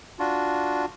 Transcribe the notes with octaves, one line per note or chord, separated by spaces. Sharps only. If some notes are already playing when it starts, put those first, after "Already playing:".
D4 F4 F#4